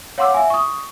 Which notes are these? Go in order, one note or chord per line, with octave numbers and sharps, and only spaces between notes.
C#5 F5 F#5 C6 D6 E6
E5 G#5
C#6 D#6